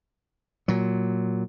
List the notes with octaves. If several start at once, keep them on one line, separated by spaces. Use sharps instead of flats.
A#2 F#3